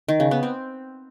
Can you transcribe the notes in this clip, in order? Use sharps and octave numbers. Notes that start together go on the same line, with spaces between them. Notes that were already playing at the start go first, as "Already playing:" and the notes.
D#3
C#3
B3
C4